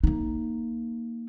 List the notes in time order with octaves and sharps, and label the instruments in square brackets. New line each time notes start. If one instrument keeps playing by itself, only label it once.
[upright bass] A#3 D#4